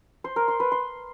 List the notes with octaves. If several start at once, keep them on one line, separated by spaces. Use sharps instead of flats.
C5
A#4
C6
B4
C6